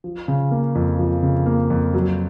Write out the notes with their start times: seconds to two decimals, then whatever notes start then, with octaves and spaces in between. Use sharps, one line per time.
0.04 F3
0.28 C#3
0.51 A#3
0.75 F2
0.99 F3
1.23 C#3
1.46 A#3
1.70 F2
1.94 F#3